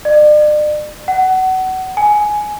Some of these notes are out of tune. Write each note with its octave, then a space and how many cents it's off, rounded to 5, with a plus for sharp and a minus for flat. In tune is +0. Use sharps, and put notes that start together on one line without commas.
D5 +40
F#5 +25
G#5 +10